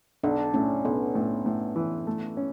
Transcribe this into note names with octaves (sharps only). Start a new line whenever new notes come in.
B1 D4
A2 C#4
B1 B3
A2
A2
E3
A3
C#4